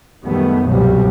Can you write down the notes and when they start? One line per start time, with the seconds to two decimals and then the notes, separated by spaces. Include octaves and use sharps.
0.24 F#2 D#3 G3 A3 B3
0.67 C2 G2 B2 F#3 G3